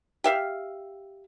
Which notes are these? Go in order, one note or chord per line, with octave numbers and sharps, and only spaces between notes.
G4 E5 F5